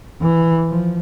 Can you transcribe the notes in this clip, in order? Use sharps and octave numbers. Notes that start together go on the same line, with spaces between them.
E3
F3